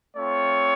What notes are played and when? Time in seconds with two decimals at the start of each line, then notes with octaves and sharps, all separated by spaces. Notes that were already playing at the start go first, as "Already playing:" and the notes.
0.17 A3 C4 F4 C#5